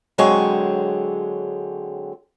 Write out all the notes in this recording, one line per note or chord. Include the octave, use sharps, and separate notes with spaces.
D3 F#3 G#3 C4 G#4 C#5